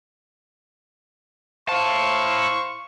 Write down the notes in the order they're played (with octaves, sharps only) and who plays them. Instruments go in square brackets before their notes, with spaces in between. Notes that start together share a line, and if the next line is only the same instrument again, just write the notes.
[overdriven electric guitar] E4 A5 [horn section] C5 F5 [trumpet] C#6